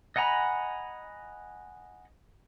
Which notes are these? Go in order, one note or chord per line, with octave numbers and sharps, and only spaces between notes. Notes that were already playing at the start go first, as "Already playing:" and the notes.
D#5 F#5 G#5 A#5 B5